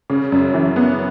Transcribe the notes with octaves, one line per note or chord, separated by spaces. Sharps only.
C#3
F#2
E3
B3